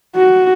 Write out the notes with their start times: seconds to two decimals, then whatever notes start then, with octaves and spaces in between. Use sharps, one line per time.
0.16 F#4